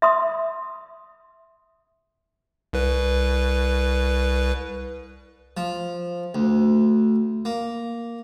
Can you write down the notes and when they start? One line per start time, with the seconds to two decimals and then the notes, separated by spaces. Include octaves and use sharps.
0.02 E5 C6 D#6
2.73 C2 B4
5.57 F3
6.35 D2
7.45 A#3